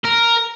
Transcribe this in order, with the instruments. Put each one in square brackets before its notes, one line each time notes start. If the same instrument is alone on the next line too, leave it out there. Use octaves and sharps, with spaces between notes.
[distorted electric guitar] A#4